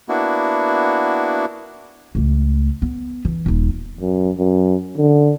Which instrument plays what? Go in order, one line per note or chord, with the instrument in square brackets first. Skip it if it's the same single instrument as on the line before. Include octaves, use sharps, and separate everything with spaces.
[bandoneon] A#3 B3 D4 E4 F#4
[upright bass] C#2 A3
B3
E3
D#1 D#4
[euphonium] F#2
F#2
D3